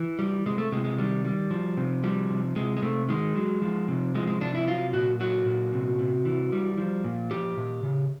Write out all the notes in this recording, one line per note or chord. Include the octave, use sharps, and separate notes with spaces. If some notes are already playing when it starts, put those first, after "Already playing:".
Already playing: E3
G3
C3 G#3
A3
C3 G#3
G#3
D#3 G3
G3
F3
C3
F3 G3
C3
C3 G#3
G#3
C3 A3
D#3 G#3
F#3
F3
C3
F3 G#3
G#3
C3 D4
E4
F#3 F4
A#2 F#4
F#3 F#4
A#2
C3
C3
E3
G3
F3
A#2
F3 G4
A#2
C#3